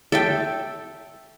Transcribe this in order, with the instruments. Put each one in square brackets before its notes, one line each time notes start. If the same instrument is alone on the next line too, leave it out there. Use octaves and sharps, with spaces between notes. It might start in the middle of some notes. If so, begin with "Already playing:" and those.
[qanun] A4 E5 G5